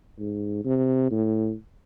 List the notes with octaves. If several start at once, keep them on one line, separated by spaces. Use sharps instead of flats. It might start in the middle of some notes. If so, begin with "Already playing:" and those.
G#2
C3
A2